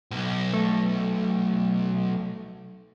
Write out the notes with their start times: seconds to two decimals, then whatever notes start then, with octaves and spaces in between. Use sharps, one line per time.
0.11 B1
0.53 A3